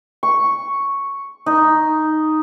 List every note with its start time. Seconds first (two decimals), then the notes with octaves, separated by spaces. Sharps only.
0.23 C#6
1.46 D#4